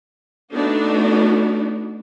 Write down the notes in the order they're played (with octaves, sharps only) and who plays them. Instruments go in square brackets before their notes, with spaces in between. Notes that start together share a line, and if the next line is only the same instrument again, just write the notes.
[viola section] A3 B3 D4 D#4 F#4